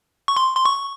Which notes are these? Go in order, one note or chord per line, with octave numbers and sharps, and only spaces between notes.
C#6
C6
C6
C#6